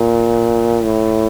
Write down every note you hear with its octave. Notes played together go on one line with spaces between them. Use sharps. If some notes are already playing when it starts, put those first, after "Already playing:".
Already playing: A#2
A2